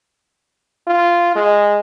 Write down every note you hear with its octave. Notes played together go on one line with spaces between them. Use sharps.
F4
G#3